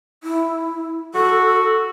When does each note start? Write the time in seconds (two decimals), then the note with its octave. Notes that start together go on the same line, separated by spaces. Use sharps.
0.23 E4
1.14 F#4 A4